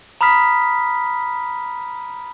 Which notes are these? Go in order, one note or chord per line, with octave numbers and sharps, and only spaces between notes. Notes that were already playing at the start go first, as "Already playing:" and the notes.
A#5 B5 D#6 F6 B6